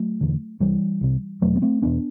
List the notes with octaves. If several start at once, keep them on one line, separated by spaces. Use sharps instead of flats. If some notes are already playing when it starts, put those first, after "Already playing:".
Already playing: F#3 A3
E1 E2 D3
C2 C3 E3 G3
C2 C3
E1 E2 B2 F#3 A3
B3
A3 C4
E1 E2 B2 B3 D4